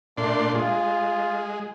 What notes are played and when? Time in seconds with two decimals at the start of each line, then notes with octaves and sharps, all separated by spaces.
0.17 A#2 A3 D4 C6
0.54 G#3 F4